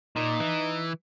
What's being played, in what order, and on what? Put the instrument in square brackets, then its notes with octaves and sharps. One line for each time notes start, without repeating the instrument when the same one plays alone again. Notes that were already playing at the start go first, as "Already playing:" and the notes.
[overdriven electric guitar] A#2 [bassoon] D#4
[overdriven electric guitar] E3